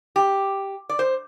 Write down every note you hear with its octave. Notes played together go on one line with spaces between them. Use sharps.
G4
D5
C5